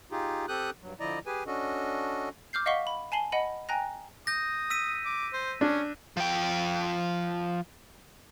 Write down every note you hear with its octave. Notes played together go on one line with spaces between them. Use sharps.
D#4 F4 G4 G#4
C4 G4 A4 D#6 F#6 G6
G2 F#3
D3 F3 E4 D5 D#5 A#5
G4 G#4 B4 G#5
C#4 D4 F#4 A4 D#5
D6 F6 G6 C7
D#5 F5 F#5 C#6 B6 G7
B5
G#5 A5 C7 F#7 G7
D#5 F#5 B5 D#7
G5 G#5 A#5 F#6 A#6
D#6 G6 A#6
E6 B6 D#7
D6
C5
C#4 D4
F3 G5